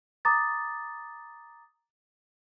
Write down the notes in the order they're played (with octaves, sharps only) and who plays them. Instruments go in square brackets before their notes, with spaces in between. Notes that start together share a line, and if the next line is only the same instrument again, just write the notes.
[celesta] A#5 D6 D#6 A6